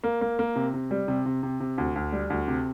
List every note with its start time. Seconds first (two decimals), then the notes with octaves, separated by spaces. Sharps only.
0.04 A#3
0.21 A#3
0.39 A#3
0.56 C3
0.74 C3
0.91 G3
1.08 C3
1.26 C3
1.43 C3
1.60 C3
1.78 D2
1.96 D2
2.12 G3
2.30 D2
2.48 C3